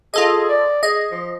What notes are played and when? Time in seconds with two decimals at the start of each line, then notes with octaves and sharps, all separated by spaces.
0.14 F4 G#4 A4 D#5
0.49 D5
0.83 G#4 D#5
1.11 F3